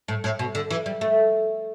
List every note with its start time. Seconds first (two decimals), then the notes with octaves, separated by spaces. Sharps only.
0.08 A2
0.24 A2
0.39 B2
0.55 D3
0.70 E3
0.86 G3
1.01 A3